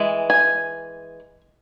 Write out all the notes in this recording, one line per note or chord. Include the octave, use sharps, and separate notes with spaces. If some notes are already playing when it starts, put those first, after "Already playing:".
Already playing: E3 G#3
G#5